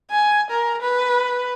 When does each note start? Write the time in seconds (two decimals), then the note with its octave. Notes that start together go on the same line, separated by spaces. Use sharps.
0.11 G#5
0.51 A#4
0.82 B4